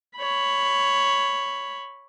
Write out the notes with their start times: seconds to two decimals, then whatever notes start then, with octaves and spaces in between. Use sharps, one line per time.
0.17 C#5 B5